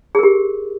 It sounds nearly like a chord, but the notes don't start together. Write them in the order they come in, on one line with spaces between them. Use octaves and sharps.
G#4 A#4 G4